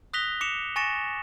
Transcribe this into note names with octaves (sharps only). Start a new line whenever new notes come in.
D#6 F#6 A#6 B6 F7 G7
D6 C#7 E7 F7
G#5 C#6 A6 A#6 C#7 E7